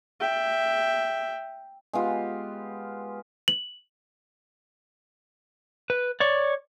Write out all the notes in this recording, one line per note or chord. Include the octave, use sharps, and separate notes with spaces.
E5 G5
G#3 B3 F4 G4
F#7
B4
C#5 D5